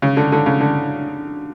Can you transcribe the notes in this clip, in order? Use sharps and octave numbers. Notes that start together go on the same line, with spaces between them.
C#3
D3
D3
C#3
D3